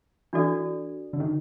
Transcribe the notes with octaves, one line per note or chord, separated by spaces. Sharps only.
E3 D4 F#4 A4 D5
D3
D#3